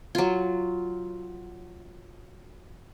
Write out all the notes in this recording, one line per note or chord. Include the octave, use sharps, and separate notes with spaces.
F#3 F4